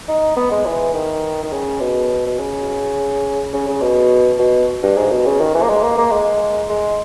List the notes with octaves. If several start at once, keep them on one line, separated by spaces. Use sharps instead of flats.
D#4
B3
G#3
E3
D#3
D#3
C#3
B2
B2
C#3
C#3
C#3
B2
B2
G2
G#2
B2
C#3
D#3
E3
A#3
G#3
A#3
A#3
G#3
G#3